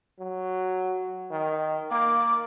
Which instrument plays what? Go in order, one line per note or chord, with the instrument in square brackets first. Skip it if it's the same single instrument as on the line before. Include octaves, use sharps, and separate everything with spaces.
[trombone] F#3
D#3
[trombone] A#3 [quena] D6